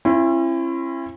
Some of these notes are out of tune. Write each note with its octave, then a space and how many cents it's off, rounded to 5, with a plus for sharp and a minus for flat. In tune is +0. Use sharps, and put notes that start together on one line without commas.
C#4 -45 E4 +30